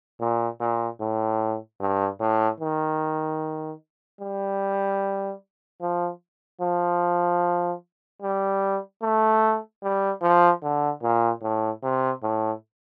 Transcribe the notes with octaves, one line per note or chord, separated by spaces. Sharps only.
A#2
A#2
A2
G2
A2
D#3
G3
F3
F3
G3
A3
G3
F3
D3
A#2
A2
C3
A2